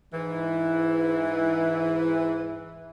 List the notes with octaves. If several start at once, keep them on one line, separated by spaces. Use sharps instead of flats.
G#2 E3